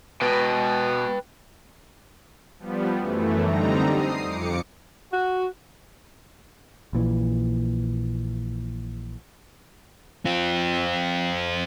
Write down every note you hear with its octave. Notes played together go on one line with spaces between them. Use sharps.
B2 B4 G5
F3 G3 B3
F#2 E3 A3
D3 G3 C4 D#4 A#5
D#6 C7
F2 D6 C#7
F#4
A#1 A#2 E3
C4 F4